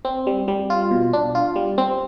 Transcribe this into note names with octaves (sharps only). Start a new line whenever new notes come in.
C4
G3
G3
F4
B2
D4
F4
G3
C4